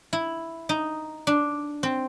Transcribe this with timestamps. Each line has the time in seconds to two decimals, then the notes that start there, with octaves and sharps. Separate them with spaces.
0.13 E4
0.69 D#4
1.27 D4
1.83 C4